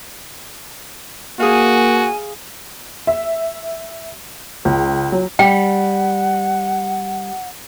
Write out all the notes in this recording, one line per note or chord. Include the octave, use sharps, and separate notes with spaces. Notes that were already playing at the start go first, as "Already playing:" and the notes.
A#3 F#4 G#4 F5 G#5
E5
C#2
F#3
G3 F#5 G5